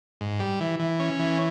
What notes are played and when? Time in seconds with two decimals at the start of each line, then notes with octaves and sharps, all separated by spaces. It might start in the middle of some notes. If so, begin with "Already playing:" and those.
0.21 G#2
0.40 G3
0.60 E3
0.80 E3
1.00 C#4
1.19 E3